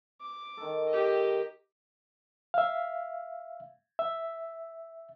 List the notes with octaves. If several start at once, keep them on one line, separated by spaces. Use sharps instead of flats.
D6
D#3 A4
G4 D#5
E5 F5
E5